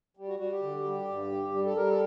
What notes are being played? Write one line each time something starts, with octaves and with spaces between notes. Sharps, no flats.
G3
F#4
G3 F#4
G4
D3
G3
G2
G3
G3
A4
G3 A#4
A4